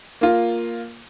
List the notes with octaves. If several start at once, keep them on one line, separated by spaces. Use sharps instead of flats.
A#3 F4